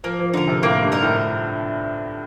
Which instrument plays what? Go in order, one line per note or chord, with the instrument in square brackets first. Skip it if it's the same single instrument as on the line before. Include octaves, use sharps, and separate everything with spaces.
[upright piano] F3 [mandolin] A#3
[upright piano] F3
[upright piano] D3 [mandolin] D#4 A#4
[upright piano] C3
[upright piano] A2 [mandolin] A#3
[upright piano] G2
[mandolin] D#4 A#4
[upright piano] A2